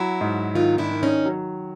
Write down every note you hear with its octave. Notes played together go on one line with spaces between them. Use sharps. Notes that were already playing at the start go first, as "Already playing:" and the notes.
Already playing: F#3 E4 F#4
G#2
D#3 D#4 F4
D4 E4
D#3
C#4 D#4
F#3